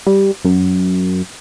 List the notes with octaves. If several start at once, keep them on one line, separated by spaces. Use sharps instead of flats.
G3
F#2